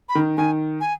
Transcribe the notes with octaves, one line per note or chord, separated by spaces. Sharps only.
B5
D#3
D#3 G#5
G#5